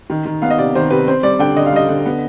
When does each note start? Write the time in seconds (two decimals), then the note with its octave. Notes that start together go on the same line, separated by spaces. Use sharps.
0.10 D#3
0.25 D#3
0.42 B3 F5
0.50 D#5
0.58 C3 D5
0.75 D#3 C5
0.90 C3 B4
1.07 C4 C5
1.23 G3 D5
1.39 D3 G5
1.56 D3 D#5
1.66 F5
1.72 G3 D#5
1.89 D3
2.06 B3